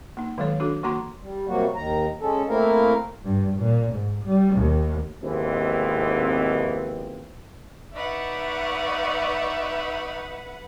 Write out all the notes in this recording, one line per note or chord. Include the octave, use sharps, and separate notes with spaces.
A#3 D#4
D#3 F#3 G#3 A4 C#5
D4 F#4 A4
E3 A#3 F#4 A#5 C6
G3
C3 F#3 G3 A#3 F#4
D#2 D#3 A#5
G#3 C#4 A4
A3 A#3 C4 E4 A#4 F5
G2
A#2
G#2
G3
D#2
D#2 G#2 B2 E3 F3 C4
D#4 B4 D5 E5 F#5 C#6